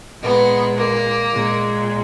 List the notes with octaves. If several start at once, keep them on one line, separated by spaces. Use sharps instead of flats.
A#2 G#3 B3
A#3
A#2 G#3